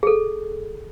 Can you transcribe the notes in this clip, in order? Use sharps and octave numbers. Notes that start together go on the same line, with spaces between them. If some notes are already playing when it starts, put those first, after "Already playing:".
G#4 A4